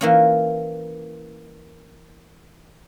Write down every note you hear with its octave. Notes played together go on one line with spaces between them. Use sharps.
E3 A#3 C#4